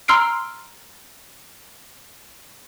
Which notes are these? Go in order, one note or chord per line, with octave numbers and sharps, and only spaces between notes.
A#5 C6 E6 F6 C7 D7